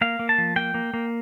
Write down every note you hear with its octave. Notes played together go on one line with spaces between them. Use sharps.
A#3 F5
A#3
A5
F3
A#3 G5
A#3
A#3